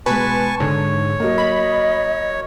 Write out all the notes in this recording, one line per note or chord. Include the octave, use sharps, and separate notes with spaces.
B2 G#3 B4 G#5 A5 C#6
G#2 D3 C#5
F#3 A#3 D#5
B5